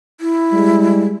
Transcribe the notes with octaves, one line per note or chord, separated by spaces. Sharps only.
E4
G3 G#3